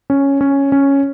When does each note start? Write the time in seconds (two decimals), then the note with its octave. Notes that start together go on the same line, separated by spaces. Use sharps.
0.10 C#4
0.41 C#4
0.72 C#4